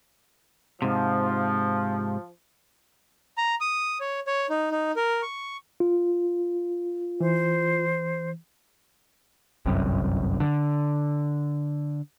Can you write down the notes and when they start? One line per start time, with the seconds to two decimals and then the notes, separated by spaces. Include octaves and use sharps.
0.82 G#2 C3 F3
3.38 A#5
3.61 D#6
4.00 C#5
4.27 C#5
4.50 D#4
4.71 D#4
4.96 A#4
5.22 C#6
5.80 F4
7.20 E3 C5
9.66 G1 C2 F#2 C3
10.40 D3